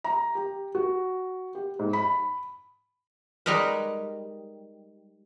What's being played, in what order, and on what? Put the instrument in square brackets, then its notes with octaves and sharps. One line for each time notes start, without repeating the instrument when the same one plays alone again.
[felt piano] A#5
G4
F#4
G4
G#2
B5
[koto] G3 G#3 D#4 A#4 B4